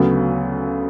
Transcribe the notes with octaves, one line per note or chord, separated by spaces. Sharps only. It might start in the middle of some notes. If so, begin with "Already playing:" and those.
Already playing: D2 C#3 F#3 B3